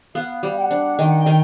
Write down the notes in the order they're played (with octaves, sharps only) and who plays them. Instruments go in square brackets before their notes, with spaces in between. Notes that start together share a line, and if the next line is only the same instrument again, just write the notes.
[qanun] B3 [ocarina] F5
[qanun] G3
[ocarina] G5
F#5
[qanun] D4
[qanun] D#3 [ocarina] G5
[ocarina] F#5
G5
[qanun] D#3